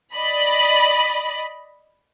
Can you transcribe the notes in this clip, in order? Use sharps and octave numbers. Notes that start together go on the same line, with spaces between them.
D5 D#5 B5